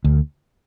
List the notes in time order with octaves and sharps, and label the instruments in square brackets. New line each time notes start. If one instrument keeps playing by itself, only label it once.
[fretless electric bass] D2